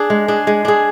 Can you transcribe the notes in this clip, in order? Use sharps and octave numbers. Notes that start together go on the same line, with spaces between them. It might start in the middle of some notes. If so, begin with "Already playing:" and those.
Already playing: D4 G#4
G#3
D4 G#4
G#3
D4 G#4